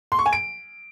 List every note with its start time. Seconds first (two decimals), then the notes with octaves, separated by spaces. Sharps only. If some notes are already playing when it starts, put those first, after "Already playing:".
0.12 C6
0.19 C#6
0.26 G#5
0.33 D7